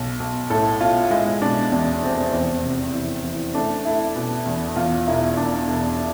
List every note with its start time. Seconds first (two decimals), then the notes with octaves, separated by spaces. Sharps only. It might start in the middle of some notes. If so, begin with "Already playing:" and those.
Already playing: B1
0.20 B1
0.50 A2 A4
0.81 B1 F4
1.11 G#3 E4
1.42 B2 D4
1.72 E2 D4
2.02 F1 C4
2.33 E2 C4
2.64 C3
2.94 E3
3.24 E3
3.54 A3 D4
3.85 A3 E4
4.15 B2
4.46 E2
4.76 E2 F4
5.07 E1 E4
5.37 E1 D4
5.68 E1